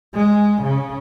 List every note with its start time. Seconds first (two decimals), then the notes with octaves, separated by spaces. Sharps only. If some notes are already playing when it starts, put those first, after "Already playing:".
0.14 G#3
0.62 C#3